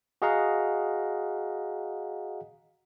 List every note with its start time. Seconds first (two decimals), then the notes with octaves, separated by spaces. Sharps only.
0.22 F#4 G#4 D#5 F5 F#5 A#5